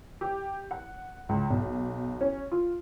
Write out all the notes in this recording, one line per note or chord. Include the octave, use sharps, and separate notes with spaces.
G4
F#5
C#2
B1
C#4
F4